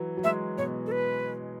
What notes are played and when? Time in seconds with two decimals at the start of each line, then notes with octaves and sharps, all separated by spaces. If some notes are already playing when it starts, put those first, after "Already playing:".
Already playing: E3 F#3
0.17 F#3
0.24 G#3 E5
0.58 B2 C#5
0.86 A4
0.92 B4